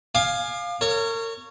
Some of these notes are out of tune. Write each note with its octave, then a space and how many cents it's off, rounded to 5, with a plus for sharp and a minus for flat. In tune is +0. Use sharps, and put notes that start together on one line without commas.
F5 +5 G#5 +0 D6 +45
A#4 -35 C#5 +0